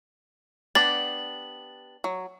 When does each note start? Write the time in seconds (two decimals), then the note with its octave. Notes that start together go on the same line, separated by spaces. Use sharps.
0.75 B3 D4 G4 A6 F#7
2.04 F#3